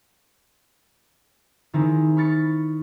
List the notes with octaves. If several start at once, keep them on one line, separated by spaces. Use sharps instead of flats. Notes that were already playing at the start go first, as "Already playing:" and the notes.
D#3 C4 D#4 E4 G#4
B5 C#6 F6 A6 C#7